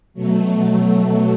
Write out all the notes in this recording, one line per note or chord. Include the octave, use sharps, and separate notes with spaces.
B2 F#3 A3